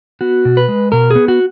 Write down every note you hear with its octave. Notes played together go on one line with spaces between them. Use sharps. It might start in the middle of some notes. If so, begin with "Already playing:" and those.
B3 F#4
B2
B4
G#3
B2 A#4
B3 G#4
F#4